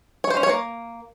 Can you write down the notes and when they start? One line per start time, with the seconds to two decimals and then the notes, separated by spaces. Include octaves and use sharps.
0.24 C#5
0.30 C5
0.37 C#4
0.43 C#5
0.50 A#3